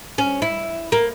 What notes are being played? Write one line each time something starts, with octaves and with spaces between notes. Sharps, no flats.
C#4
E4
A#3